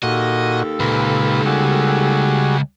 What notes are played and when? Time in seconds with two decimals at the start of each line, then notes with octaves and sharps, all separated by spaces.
0.03 D#2 A#2 F#4 A4 D#5
0.80 C#2 A#2 B4
1.46 G3 F#4 G#4